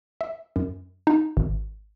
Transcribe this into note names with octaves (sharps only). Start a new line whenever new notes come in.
E5
F#2
D#4
G#1